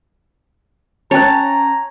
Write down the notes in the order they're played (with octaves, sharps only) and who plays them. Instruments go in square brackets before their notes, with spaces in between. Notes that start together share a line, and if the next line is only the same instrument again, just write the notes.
[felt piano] C#4 G5 F#6 [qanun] C#5 [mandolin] A5 [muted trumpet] A#5